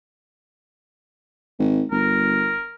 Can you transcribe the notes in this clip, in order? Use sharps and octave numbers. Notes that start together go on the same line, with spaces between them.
G#1
G1 A#4